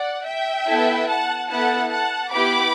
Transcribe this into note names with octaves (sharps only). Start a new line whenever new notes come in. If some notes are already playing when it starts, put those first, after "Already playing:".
Already playing: D5 F#5
E5 G5
B3 E4 A4
F#5 A5
B3 E4 A4 F#5 A5
F#5 A5
B3 E4 G4 B5 D6